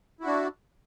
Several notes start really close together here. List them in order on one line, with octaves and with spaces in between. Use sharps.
E4 F#4 D4